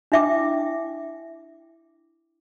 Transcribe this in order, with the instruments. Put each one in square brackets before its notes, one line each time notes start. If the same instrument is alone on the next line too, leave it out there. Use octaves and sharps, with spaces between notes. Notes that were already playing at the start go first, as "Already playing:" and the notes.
[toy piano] D4 E4 E5 G5 D6